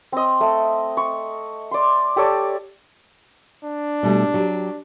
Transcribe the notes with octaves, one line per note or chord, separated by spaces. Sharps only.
C4 D#5
A3
C#6
D5 C6
G4 A4 C#5 D5
D4
B2 G3 A3
F#3 G4